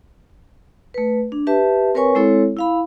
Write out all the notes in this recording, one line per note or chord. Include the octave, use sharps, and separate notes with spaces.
A3 B4
D4
G4 B4 E5 A5
C4 A#4 B4 C#5 G#5 C#6
G#3 C4 E4 A4 C#5
E4 F5 B5